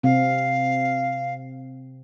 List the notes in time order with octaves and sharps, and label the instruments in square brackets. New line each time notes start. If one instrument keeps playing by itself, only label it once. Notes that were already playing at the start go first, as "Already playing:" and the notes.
[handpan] C3 C4 [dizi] F5